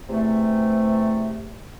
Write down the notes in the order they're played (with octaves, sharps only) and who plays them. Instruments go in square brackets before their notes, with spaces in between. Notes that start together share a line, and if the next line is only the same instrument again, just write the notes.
[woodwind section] E2 C3 A3